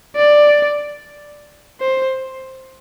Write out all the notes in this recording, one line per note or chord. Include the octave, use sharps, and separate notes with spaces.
D5
C5